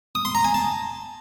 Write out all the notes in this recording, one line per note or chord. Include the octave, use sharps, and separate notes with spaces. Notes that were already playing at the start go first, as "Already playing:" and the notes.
D#6
C6
A#5
G#5
A5